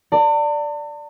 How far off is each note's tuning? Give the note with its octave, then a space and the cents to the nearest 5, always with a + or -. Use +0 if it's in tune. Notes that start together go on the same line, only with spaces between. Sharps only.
D5 +0 A5 +45